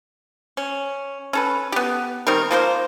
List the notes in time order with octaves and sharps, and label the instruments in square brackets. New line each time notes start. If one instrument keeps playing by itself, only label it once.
[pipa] C#4
C#4 A4 B4
B3 G4
D#3 G3 C4 A#4
F3 A#3 B4 C5